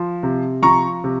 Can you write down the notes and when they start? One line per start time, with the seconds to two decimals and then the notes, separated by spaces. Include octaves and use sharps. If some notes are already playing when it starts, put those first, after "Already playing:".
Already playing: F3
0.23 C3
0.63 F3 A#5 C#6
1.04 C3